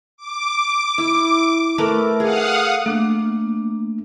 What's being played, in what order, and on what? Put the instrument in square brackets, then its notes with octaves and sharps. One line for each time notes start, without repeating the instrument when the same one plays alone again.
[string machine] D6
[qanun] E4
A3 A#4 B4
[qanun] G#4 [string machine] F5 F#5 D#6
[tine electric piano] A3 [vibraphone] A#3 D4